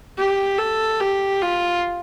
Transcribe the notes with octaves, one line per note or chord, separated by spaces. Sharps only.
G4
A4
G4
F4